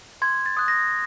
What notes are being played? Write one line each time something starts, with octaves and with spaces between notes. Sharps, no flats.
C6 G#6
A6
D#6 F#6
A#6